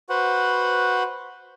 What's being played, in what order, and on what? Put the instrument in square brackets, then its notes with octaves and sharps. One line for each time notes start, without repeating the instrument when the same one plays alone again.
[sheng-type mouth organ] F#4 B4 C5 F#5